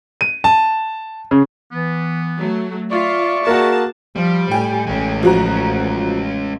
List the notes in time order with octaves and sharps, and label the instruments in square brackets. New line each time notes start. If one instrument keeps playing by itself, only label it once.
[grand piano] D#7
A5
C#3
[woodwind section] E3 B3
[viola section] F#3 A3
[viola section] F4 [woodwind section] D5 E5 C#6
[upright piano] A#3 F#4 [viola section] G#4 A5
[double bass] F3 [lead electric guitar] G3
[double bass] A2 [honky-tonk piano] G5 G#5
[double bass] A1 [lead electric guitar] G#3 C#4
[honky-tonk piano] F3 F#4 A#5